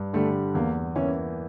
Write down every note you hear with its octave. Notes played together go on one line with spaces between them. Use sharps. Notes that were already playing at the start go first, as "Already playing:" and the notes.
Already playing: G2
D3 G3 A3
E2 A#3
E3 A#3 C#4